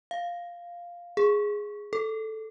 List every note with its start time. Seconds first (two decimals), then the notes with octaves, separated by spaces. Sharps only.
0.11 F5
1.17 G#4
1.93 A4